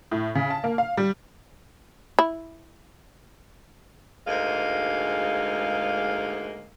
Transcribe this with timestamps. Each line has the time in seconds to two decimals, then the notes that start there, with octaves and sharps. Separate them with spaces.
0.12 A2
0.35 C#3
0.50 A5
0.64 A#3
0.78 F5
0.97 G3
2.19 E4
4.26 D2 G#2 G#3 A#3 D#5 F5